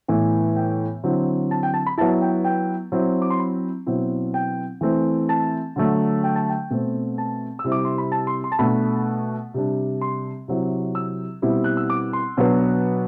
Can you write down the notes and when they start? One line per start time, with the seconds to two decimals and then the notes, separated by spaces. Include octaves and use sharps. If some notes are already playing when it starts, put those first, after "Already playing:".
0.08 A2 E3 B3
0.56 G5
1.04 D3 F#3 C4 E4
1.51 A5
1.63 G5
1.74 A5
1.87 B5
1.98 F#3 B3 E4 A5
2.21 G5
2.45 G5
2.92 F#3 C4 E4
3.22 D6
3.30 C6
3.39 B5
3.86 B2 F#3 C4 E4
4.34 G5
4.81 E3 A3 C4 E4
5.29 A5
5.76 D3 F#3 A3
6.24 G5
6.36 A5
6.49 G5
6.70 B2 A3 C4
7.18 A5
7.59 E6
7.64 C3 G3 C4 E4
7.72 D6
7.85 C6
7.98 B5
8.12 A5
8.27 C6
8.44 C6
8.52 A5
8.59 B2 A3 D4 B5
9.54 C3 G3 D4
10.01 C6
10.48 C3 F#3 C4 E4
10.95 E6
11.42 B2 G3 C4 E4
11.64 F#6
11.77 E6
11.90 D6
12.13 C6
12.37 B2 F#3 B3 D4